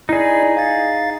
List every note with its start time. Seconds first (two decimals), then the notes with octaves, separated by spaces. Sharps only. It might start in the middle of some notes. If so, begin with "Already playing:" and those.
0.09 D#4 E4 G#4 D5
0.57 F5 A6